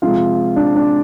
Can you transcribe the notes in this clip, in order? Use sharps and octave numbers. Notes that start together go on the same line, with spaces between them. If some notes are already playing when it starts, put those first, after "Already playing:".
C3 F3 G#3 F4
D4
D4